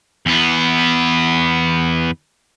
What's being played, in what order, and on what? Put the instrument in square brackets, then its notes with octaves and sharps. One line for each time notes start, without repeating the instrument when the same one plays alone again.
[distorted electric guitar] E2 B3